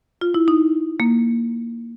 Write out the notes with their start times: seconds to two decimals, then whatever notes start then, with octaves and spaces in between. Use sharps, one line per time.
0.21 F4
0.34 E4
0.48 D#4
1.00 A#3